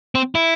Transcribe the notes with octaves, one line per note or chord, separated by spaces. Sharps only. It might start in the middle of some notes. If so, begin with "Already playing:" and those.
C4
E4